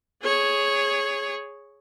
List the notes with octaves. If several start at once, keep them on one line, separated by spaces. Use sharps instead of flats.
G#4 C#5